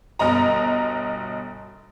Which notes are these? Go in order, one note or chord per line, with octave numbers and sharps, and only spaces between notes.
G1 B2 D#5 A#5